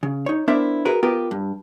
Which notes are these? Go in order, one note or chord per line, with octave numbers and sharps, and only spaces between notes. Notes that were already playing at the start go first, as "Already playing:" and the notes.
C#3
D#4 C#5
B3 D4 E4 A#4 C5 E5
F#4 G#4 A#4 B4
B3 F4 G4 A#4 B4
G2